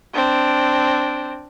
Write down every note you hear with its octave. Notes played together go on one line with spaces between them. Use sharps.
C4 D4